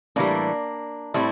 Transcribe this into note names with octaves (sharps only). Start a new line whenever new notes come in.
A2 E3 G3 A#3 D4
A2 G3 C4 E4